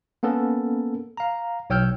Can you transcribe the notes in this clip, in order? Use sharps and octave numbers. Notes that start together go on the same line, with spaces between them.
A#3 B3 C#4 A4 A#4
F5 A#5
B1 C#5 G5 E6 F6 G6